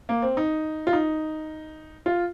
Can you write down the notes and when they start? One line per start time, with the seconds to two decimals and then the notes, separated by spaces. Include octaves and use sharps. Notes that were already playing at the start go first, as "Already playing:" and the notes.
0.09 A#3
0.22 C4
0.37 D#4
0.87 F4
0.93 D#4
2.06 F4